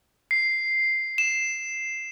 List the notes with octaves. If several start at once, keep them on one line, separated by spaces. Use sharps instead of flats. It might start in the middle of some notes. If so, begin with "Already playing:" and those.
C7
E7